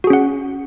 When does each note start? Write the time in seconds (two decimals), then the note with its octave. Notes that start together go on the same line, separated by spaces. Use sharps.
0.04 F#4
0.07 G#4
0.10 C#4
0.13 F#5